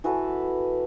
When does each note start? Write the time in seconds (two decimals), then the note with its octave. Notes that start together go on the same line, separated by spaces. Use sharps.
0.04 E3 F#4 A4 B4